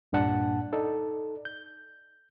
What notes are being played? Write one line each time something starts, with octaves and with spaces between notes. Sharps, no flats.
C2 G2 A#2 D4 F#5 A5
D#4 A4 D5
G6